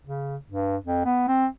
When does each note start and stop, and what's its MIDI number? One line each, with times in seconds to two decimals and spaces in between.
0.05 0.37 49
0.50 0.77 43
0.86 1.02 41
1.06 1.24 59
1.28 1.46 60